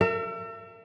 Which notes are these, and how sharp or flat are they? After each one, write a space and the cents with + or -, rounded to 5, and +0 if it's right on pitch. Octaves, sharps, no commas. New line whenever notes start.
A#4 -35 E5 +35